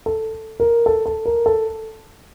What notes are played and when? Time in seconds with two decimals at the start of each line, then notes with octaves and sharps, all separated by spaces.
0.06 A4
0.60 A#4
0.86 A4
1.06 A4
1.26 A#4
1.46 A4